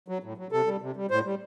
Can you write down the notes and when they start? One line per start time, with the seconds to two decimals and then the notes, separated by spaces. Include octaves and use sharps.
0.08 F#3
0.23 A2
0.37 F#3
0.52 C3 A4
0.67 G3
0.82 C3
0.96 G3
1.10 A2 C5
1.25 G3